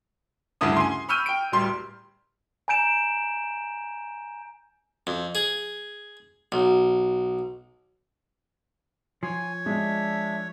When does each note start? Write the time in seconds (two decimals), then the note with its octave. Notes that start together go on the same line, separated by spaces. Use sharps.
0.61 D2 G2 C#3 E4 D#6
0.76 G#5 C6
1.09 B5 C#6 E6 F6 G6 D#7
1.26 G5 D7
1.52 D1 G3 C6
2.68 G#5 A#5 G6 D7 E7
5.07 F2
5.35 G#4
6.52 B1
9.23 F3 C#5 G#5
9.66 G#3 D4 E5